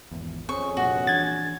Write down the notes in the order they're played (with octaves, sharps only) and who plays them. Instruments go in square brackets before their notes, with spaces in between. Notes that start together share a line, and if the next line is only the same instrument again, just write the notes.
[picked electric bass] G#1 E2
[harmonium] F2 C#4 G#4 [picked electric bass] C4 [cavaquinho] C#6
[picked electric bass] F1 G2 A#2 [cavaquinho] F#4
[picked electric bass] E3 D4 [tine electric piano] G#6 A6